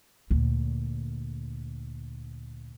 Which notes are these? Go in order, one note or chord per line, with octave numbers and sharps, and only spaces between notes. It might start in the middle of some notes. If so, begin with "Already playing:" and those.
D2 A#2